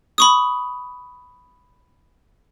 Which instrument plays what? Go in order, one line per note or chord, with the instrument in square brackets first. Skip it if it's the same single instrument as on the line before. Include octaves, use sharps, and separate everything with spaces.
[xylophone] B5 C#6 D#6